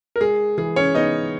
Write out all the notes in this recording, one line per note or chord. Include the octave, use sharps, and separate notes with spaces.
A#4
G#3 G#4
E3 G#4
C#4 C#5
B3 D#4 D#5